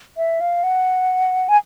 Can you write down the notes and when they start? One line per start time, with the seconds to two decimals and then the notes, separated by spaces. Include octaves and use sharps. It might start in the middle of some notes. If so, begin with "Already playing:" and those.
0.17 E5
0.41 F5
0.64 F#5
1.49 G#5